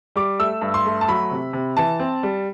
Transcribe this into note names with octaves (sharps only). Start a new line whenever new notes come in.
G3 D6
A3 E6
G2
C6
A3
A5
F#3 B5
C3
C3
E3 A5
C4
G3